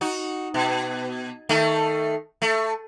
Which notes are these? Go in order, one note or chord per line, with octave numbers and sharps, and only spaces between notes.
D#4 F#4
B2
D#3 A3
A3